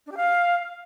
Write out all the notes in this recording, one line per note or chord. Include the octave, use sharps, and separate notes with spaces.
D4
G4
F5